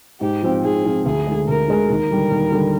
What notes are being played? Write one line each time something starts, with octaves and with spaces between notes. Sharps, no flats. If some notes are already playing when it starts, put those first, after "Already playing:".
G#2 G4
F3 C4 F4
G#2 G#4
F3 C4 F4
D2 G#4
D3 G#3
D2 A#4
D3 G#3
D#2 A#4
D3 G3
D#2
D3 G3